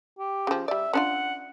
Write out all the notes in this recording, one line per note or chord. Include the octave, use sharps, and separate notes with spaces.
G4
C#3 F3
G3 D5 E5
C#4 D4 F4 F#5